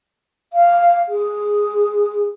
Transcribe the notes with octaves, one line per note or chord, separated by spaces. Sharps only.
F5
G#4